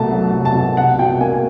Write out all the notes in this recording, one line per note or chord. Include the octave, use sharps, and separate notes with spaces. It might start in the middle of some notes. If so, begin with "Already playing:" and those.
Already playing: C2 B2 A3 A5
F#3
C2
A5
B2
C2 F#5
B2 G5
A#3 G#5